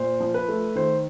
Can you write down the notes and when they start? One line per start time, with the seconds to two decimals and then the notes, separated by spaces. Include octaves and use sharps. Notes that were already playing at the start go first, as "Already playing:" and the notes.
Already playing: A#2 C5
0.20 F3
0.34 B4
0.48 A3
0.75 D#3 C5